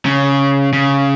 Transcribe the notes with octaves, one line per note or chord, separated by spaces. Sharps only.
C#3
C#3